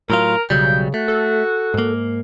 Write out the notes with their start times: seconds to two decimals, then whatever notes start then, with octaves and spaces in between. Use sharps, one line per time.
0.10 A2 F#3 F4 A#4
0.50 B1 C#3 F#3 G3 G5
0.94 A3 F#4
1.08 A4
1.74 G#2 A#3